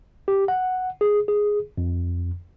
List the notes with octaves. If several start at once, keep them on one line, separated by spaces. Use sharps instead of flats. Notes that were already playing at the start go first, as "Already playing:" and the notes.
G4
F#5
G#4
G#4
F2